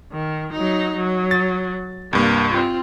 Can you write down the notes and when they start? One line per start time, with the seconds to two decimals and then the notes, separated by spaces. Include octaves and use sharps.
0.12 D#3
0.53 F#3 D#4
0.96 F#3
1.31 A6
2.13 C2 G2 A#3
2.50 C4 F4